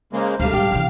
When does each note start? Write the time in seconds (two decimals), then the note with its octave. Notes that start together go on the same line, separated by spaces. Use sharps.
0.13 C#3 G#3 A#3 C5
0.40 D2 B2 G3 A3 F5
0.53 A2 G3 D4 G4 G5
0.72 C3 E3